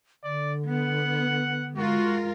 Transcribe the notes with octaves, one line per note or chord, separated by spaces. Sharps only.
D3 D5
B3 F#5
G#3 F4 F#4 A#4